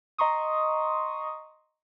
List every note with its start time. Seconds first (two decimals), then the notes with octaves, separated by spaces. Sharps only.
0.18 D#5 A#5 C6 C#6 D#6